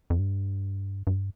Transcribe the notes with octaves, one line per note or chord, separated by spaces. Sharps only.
F2
G2
G2